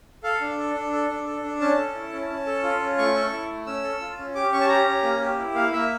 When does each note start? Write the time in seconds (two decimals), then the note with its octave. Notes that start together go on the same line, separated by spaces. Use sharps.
0.23 A4 F5
0.41 D4
0.58 A4
0.75 D4
0.92 A4
1.09 D4
1.26 A4
1.43 D4
1.60 C#4 A5
1.78 A4
1.94 E4
2.12 C#4
2.30 C#4
2.47 A4
2.63 F4
2.80 C#4
2.98 A3 C#6
3.15 A4
3.32 E4
3.50 A3
3.66 C#4 E6
3.83 A4
4.01 F4
4.18 C#4
4.35 G4 D6
4.52 C#4 C#6
4.61 A5
4.69 G4 A#5
4.87 C#4
5.03 A#3
5.21 G4
5.38 E4
5.55 A#3 F5
5.72 A#3 E5